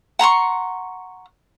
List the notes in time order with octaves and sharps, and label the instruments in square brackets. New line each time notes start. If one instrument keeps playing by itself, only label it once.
[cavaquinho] F#5 A#5 C6 C#6